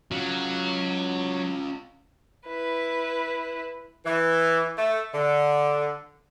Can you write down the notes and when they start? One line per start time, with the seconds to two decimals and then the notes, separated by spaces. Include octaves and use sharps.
0.12 F#3 C#4 F4
2.46 E4 B4
4.05 E3
4.78 A3
5.14 D3